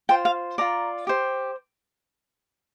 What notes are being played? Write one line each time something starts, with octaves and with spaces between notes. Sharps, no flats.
F4 C5 G5
F5
F4 D5 A#5
G4 C5